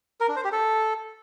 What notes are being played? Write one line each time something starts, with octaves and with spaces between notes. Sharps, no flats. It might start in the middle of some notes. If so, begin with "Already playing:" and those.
A#4
D4
C5
G4
A4